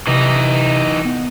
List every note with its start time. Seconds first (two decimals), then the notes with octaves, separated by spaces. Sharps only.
0.07 C3 E3 D#4
1.05 B3